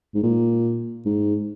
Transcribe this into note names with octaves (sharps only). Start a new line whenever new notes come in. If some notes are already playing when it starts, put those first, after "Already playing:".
G#2
A#2
G#2